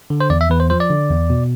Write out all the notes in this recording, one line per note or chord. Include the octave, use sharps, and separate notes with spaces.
D3
C5
E2 D5
E5
E2 B4
C5
F3 C5
D5
D3
E2
B2